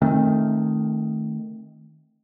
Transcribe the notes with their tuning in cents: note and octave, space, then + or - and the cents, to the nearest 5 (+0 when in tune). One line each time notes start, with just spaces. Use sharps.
D#3 +0 A3 +0 C4 +35